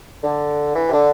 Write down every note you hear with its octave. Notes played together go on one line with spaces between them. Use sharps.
D3
E3
C3
D3